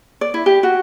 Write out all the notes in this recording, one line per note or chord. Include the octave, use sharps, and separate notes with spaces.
D5
E4
G4
F#4